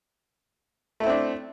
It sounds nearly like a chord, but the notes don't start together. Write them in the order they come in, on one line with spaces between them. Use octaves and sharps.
A3 E4 C4 D4